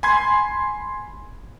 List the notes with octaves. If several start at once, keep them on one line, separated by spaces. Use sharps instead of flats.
G#5 B5 C6 G#6